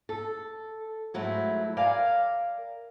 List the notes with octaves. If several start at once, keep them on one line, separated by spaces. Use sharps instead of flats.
A4
G#2 F#3 A3 E4
A#4 D5 F5 G#5